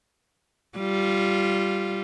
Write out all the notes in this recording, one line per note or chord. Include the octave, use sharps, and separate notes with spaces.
G3 F4